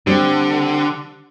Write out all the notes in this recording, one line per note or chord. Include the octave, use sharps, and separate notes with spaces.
D3 G3 C4